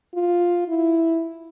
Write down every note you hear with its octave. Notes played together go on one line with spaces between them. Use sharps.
F4
E4